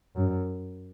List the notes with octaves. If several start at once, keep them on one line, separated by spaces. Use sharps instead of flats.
F#2